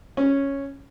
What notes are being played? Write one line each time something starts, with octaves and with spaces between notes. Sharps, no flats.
C#4